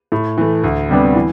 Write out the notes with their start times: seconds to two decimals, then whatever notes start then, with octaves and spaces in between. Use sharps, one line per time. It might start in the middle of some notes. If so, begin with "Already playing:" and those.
0.12 A2
0.38 E3 A3
0.64 D2
0.90 C3 G3 B3 D4
1.15 E3